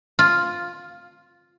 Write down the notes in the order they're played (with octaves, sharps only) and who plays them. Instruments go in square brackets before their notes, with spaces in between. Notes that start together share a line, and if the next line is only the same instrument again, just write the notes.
[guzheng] F4